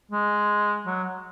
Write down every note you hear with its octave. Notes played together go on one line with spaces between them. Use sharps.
G#3
F#3